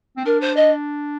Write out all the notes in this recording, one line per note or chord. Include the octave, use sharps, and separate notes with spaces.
C4
D4 A#4
C5
D#5